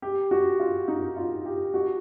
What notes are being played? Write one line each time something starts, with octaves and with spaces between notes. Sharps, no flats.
G4
F#4
F4
D#4
F4
G4
F#4